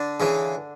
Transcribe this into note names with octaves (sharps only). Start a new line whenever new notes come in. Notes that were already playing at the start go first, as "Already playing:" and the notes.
Already playing: D3 D4
C#3 E3